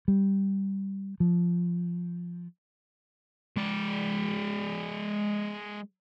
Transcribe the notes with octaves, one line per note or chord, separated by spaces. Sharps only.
G3
F3
G#3 D5